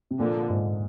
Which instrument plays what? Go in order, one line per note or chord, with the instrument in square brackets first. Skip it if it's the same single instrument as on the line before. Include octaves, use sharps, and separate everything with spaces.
[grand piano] C3
[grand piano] A#2 [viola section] D3 F3 A#3
[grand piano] G#2